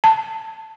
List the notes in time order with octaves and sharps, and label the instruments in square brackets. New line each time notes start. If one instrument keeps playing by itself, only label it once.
[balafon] A5